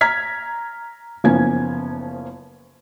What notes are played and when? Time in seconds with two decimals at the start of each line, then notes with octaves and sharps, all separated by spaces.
0.01 A#5 F6 G#6 B6
1.24 F#1 F3 A#3 B3 C#4 G#6